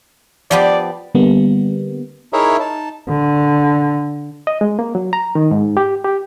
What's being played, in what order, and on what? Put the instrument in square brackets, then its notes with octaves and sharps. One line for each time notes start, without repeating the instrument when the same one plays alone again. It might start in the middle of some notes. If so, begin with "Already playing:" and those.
[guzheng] F3 B3 G4 [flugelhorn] D5
[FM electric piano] D3 G3 A#3 B3
[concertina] D#4 E4 G#4 A#4 C#5 E5
D#4 A5
[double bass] D3
[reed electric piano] D#5
G#3
A#3
F#3
A#5
D#3
G#2
G4
G4